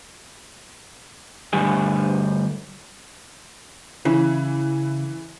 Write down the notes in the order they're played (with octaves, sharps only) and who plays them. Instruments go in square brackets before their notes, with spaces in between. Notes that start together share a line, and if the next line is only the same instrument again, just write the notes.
[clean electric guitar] D2 G2 G3 G#4
[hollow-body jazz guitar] C#3 [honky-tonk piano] E3